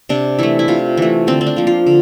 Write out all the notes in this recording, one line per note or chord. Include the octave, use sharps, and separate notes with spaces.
C3 D4
E3 A3 E4
E4
C3 F4
E3 A3
D3 C4
C4
D4
F3 A#3
F4
D3